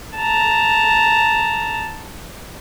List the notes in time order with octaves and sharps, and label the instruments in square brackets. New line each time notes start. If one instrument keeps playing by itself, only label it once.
[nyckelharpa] A5 A#5